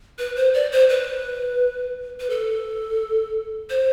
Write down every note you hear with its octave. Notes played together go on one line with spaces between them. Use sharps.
B4
C5
D5
C5
B4
B4
A4
C5